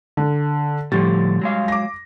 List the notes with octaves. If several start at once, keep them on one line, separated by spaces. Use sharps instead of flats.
D3
A2 D3 F3 G3 A6
F#3 G#3 F5
D6 A#6